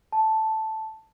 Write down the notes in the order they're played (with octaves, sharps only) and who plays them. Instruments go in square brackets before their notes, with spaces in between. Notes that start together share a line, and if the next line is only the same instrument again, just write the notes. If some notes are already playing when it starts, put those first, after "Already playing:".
[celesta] A5